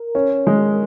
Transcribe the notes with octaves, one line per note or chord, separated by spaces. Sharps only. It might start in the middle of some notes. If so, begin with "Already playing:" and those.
Already playing: A#4
C#4
G#3